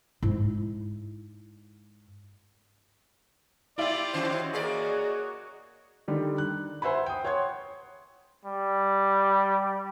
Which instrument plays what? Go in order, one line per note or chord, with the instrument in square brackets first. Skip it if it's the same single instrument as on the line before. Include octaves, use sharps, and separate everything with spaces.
[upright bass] G#2 E4
[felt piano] E4 E5 [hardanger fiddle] F4 G4 [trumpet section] D5
[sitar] D#3 C#4 C5 [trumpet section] F#4 C#5 D#5
[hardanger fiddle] A#3 [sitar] G#4 A#4 D5
[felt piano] D3 D#3 G3
F#6
C5 E5 F#5 G#5 B5
G5 D#6
C#5 F#5 C6 G#6
[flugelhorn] G3